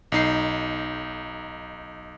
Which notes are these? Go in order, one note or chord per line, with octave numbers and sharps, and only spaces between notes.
B1 D#4 C7